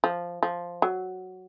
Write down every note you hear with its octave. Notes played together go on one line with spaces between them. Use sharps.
F3
F3
F#3